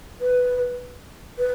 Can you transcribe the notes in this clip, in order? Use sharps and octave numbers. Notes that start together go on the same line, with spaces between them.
B4
B4